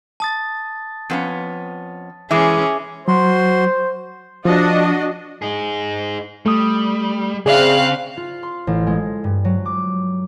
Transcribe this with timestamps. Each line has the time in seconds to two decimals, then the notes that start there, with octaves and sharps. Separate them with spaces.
0.20 A5 D#6 A6
1.10 F2 B3 C#4
2.31 E3 G#3 C#4 G#4 E5 D6
3.08 F#3 F#4 C5 C6
4.45 F3 D4 F#4 D#5
5.42 D#4 G#4
6.46 G3 A3 D#6
7.46 C#3 C4 G#4 D5 E5 F5 F#6
8.17 F4
8.43 C6
8.67 A1
8.87 G#3
9.24 G2
9.45 F#3
9.65 D6